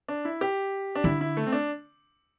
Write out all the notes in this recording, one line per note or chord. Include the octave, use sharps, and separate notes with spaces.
D4
E4
G4
D4
D3 E4
E4
A3
C4
D4